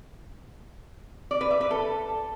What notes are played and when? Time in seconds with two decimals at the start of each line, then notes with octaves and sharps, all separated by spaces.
1.31 D5
1.41 B4
1.51 E5
1.61 B4
1.71 A4